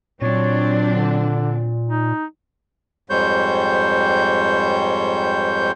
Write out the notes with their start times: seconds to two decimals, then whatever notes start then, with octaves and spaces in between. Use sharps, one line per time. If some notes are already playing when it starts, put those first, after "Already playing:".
0.22 A#2 F#3 C4 D4 C#5
0.90 D3
1.88 D#4
3.10 F2 G#2 G3 C5 C#5 G6